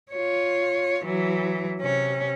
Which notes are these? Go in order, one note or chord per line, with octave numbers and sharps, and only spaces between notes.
F4 C#5
E3 F#3
C3 C#4